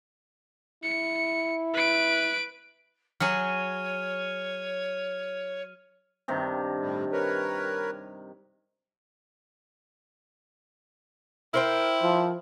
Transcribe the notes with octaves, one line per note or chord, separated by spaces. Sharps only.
E4 C#7
B4 D7
F#3 F#4 G#4 C#5 F6 D#7
G2 C3 D#3
A2 G3
A#4 B4 C#5
E4 A#4 C5 G5
F3